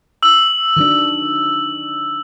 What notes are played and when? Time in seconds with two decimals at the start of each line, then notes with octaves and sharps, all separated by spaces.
0.23 E6 F#7
0.77 D#3 F#3 D4